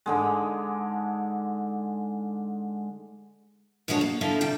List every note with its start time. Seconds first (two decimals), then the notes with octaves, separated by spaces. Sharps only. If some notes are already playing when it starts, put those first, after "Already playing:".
0.06 G#2 D3 G#3
3.88 A#2 D3 F3 G#3 F#4 C#5
4.01 A#3
4.21 D3 F3 E4 F4 A4
4.41 C3 G3 G5 A5